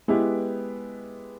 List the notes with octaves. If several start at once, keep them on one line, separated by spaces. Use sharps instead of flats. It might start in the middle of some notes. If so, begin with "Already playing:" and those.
G#3 B3 E4 G4 B4